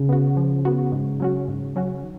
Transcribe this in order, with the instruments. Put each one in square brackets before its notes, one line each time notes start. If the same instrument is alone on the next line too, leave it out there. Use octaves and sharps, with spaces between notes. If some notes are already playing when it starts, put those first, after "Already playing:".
Already playing: [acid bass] C#3
[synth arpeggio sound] B3 F#4
F3
B3 F#4
G#2
F#3 C#4 F#4
G#2
F#3 C#4 F#4
[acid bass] D#3